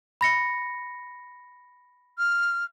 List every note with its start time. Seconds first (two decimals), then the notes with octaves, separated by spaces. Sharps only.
0.21 B5 A#6 C#7
2.18 F6